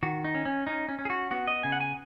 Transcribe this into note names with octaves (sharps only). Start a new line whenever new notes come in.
D#3 F#4
D#4
C#4
C#4
C#4 D#4
C#4
C#4
G#4
F#4
B3 F#4
D#5
C#3 G#5
F#5
G#5